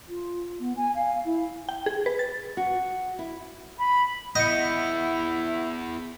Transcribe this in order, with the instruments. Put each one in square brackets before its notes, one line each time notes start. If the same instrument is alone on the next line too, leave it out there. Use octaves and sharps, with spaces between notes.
[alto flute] F4
B3
G#5
F5
E4
[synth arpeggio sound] G5
G#4
B4
A6
[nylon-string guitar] F#4
E4
[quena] B5
[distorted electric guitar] E2 B3 [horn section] E4 [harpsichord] D#5 [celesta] G6 C#7